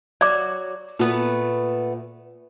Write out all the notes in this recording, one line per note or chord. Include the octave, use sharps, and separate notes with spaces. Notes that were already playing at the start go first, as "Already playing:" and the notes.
F#3 F#4 D5 D6
A#2 A3 B3 B4